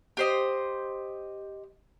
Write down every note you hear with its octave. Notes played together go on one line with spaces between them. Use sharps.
G4 C5 D#5